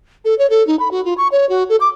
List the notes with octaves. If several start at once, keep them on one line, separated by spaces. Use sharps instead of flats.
A4
C#5
A4
D#4
B5
F#4
F4
C#6
C#5
F#4
A4
D6